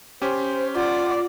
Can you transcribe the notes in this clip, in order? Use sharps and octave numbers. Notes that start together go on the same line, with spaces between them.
C#4 G4 C5
F4 D5 F#5